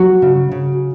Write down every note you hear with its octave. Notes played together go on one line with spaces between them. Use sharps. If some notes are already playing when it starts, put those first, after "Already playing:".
Already playing: F#3 F#4
C#3
C#3